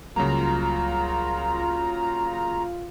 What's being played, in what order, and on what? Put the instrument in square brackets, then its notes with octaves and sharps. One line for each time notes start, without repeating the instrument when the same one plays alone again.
[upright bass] C#2 G3 [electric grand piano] C#3 F#3 A#3 [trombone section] F4 [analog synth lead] A#5